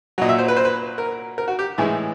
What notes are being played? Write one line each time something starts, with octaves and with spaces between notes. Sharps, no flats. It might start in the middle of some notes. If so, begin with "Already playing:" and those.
A#2 F#3 D#5
E5
C5
B4
C5
B4
A#4
A#4
F#4
G4
A2 E3 G#3 E4